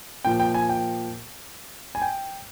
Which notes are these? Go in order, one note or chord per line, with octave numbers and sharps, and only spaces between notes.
A#2 F3 G5
G5
G#5
G5
G#5
G5